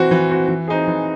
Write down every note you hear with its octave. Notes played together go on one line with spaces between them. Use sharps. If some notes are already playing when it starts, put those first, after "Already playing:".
Already playing: E3 C4 F#4
E3
C4 F#4
E3
C4 D#4 G#4
E3